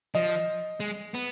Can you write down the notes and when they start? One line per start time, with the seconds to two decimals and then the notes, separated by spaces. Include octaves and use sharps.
0.15 F3 D#5
0.80 G#3
1.14 B3